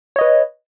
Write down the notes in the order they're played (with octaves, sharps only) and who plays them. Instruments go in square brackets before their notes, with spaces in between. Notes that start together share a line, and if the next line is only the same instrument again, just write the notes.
[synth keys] C#5
D#5
B4